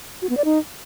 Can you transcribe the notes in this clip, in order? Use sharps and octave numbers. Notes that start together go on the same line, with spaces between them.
F#4
B3
D5
D#4